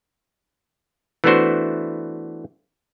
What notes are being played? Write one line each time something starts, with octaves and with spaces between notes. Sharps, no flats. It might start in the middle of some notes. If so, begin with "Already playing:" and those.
E3 A3 B3 D4 F#4 C5